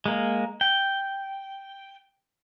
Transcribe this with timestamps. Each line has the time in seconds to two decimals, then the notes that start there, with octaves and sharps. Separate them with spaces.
0.06 G#3 A#3
0.61 G5